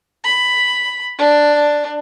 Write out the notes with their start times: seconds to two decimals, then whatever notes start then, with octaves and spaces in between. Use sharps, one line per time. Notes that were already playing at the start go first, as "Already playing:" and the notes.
0.24 B5
1.18 D4